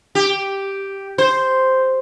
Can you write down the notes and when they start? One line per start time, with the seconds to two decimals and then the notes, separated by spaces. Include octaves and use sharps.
0.15 G4
1.18 C5